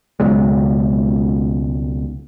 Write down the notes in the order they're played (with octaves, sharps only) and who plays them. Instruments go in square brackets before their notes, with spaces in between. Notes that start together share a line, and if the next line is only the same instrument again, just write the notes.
[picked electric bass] C#2 B2 F#3 G#3